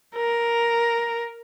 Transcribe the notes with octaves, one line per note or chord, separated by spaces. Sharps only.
A#4